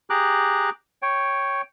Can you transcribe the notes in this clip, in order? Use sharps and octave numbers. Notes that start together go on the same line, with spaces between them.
G4 G#4 A#5 D6 F#6
C#5 G5